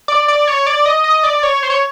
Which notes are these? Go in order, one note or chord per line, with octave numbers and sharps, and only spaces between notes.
D5
D5
C#5
D5
D#5
D#5
D5
C#5
C5
C#5